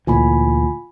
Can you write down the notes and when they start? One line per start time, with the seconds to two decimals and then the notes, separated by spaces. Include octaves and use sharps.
0.07 D2 A#2 E3 F4 G#5 B5